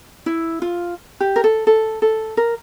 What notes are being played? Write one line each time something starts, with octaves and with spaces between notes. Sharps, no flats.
E4
F4
G4
A#4
A4
A4
A4
A#4